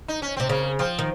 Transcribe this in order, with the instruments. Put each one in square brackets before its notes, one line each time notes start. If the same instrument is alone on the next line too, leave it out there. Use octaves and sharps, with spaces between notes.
[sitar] D#4
C#4
[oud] C3 [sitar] C4
[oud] C#3 [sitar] A#3
[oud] F3 [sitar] C4
[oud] D#3